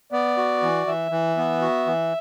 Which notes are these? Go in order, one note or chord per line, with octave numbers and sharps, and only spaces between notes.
B3 D5
F#4
E3
E3 E5
E3
B3
F#4
E3